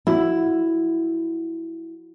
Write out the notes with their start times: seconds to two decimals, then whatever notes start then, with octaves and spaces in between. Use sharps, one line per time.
0.07 F3 E4 F#4